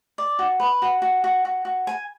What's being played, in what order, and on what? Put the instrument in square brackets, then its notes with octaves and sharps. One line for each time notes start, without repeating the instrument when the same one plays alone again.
[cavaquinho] D5
F#4
B4
F#4
F#4
F#4
F#4
F#4
G#5